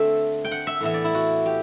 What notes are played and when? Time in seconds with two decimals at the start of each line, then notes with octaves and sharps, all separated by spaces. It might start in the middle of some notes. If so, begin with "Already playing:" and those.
Already playing: D3 A3 C4 E5
0.45 G5
0.52 F#5
0.67 E5
0.81 A2 E3 B3 E5
0.94 D5
1.05 E4
1.15 F#4
1.46 G4